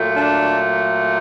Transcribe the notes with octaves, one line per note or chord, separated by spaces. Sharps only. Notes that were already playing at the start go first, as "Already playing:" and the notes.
Already playing: A#2 F#3 A3
D4